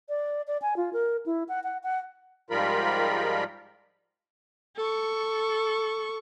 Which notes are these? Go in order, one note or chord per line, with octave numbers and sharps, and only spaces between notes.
D5
D5
G#5
F4
A#4
E4
F#5
F#5
F#5
G#2 F3 G3 F4 A#4 B5
A4 C#6